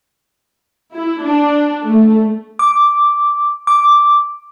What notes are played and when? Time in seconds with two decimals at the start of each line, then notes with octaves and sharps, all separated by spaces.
0.94 E4
1.24 D4
1.86 A3
2.59 D6
3.67 D6